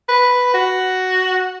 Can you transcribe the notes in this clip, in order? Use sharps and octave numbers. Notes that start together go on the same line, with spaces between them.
B4
F#4